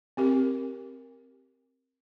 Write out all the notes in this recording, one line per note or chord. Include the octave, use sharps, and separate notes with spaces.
C4 G4 A#4